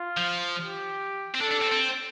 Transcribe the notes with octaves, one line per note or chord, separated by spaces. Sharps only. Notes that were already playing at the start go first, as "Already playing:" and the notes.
Already playing: F4
F3
G4
C4
D4 A4
D4
C4
C4